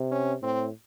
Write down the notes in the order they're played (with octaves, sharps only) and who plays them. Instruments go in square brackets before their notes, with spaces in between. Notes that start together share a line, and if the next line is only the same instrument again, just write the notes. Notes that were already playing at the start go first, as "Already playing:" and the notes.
Already playing: [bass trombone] C3
[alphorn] C#4
[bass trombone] A2 [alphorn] C4